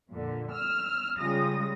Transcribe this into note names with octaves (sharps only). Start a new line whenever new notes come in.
F2 A#2 D3
E6 F6
C#3 G3 G#3 F4 D#6 A#6